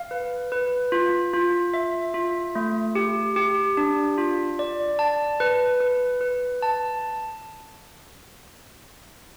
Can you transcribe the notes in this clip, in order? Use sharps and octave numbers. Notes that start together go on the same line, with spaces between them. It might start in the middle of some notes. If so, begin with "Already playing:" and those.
Already playing: F5
B4
B4
F4
F4
E5
F4
A3
G4
G4
D4
F4
D5
A5
B4
B4
B4
A5